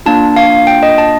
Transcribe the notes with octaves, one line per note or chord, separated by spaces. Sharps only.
A#3 D4 F4 A5
F5
G5
D#5
A5